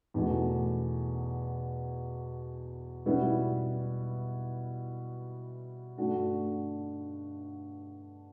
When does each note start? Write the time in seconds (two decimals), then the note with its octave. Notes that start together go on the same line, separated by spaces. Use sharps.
0.14 E2 B2 A3
3.06 B2 G3 B3 E4
5.97 G2 D3 A3 D4 F#4